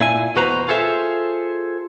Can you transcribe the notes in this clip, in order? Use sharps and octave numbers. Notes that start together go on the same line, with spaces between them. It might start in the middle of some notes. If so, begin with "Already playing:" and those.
A#2 E4 G#5
E2 B2 F#4 B4 C5 A#5
F4 G#4 A4 C5 E5